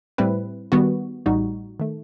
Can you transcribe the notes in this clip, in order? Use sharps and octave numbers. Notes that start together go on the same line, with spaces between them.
A2 G3 C4 E4 B4
D#3 G3 B3 F#4
A1 A2 G3 D#4 F#4
D#3 A3